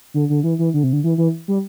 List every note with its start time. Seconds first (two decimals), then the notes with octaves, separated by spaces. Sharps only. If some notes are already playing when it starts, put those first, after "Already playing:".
0.14 D3
0.29 D3
0.43 E3
0.59 E3
0.74 D3
0.83 C3
0.93 D3
1.04 E3
1.18 E3
1.48 G3